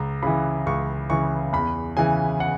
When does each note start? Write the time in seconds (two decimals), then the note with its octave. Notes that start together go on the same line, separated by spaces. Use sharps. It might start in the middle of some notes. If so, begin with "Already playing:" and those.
Already playing: C#2 A#5
0.23 C#3 E3 B5
0.66 C#2 C#6
1.10 C#3 E3 C#6
1.53 E2 B5
1.97 C#3 E3 G#5
2.40 F#5